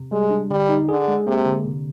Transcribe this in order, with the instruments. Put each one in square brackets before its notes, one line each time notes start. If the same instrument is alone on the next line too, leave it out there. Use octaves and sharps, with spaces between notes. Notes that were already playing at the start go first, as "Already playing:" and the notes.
Already playing: [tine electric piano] C3
[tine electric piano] G3 [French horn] G#3
[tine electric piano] D4
[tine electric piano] D3 [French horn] G3
[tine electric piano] D#4
[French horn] D3 [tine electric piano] G#4
[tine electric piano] G#3
[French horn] C3 [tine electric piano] A#3
[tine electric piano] D3
C3